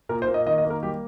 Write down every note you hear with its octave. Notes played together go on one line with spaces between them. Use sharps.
A#2 A#4
C5
A#3
D#5
D#3 D#5
D#5
A#3
A#4
G3 G4